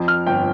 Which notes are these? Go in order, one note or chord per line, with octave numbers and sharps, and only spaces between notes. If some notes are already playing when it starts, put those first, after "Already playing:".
Already playing: F2
F6
G1 G5